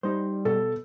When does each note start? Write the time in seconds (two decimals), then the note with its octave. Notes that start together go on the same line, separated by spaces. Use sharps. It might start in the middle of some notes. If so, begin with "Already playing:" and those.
0.03 G3 D#4 C5
0.45 B2 A4